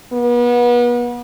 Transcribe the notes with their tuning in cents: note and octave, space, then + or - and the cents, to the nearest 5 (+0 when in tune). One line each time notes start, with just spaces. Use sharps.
B3 -35